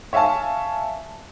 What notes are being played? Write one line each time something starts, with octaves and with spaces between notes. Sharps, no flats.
C#5 E5 F5 G#5 A5